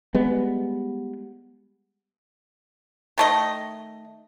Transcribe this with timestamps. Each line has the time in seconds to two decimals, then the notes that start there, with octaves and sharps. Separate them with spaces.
0.15 G3 G#3 B3
3.18 D#3 A3 D#5